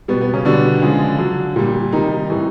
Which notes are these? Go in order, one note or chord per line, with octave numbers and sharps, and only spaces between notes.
B2 G3 B3
B3
C#3 C#4
B2 D3 G3 D4
C#3 F3 G#3
D3 F#3
A#2 G3
C3 D#3 G3 D#4
A2 E3 G3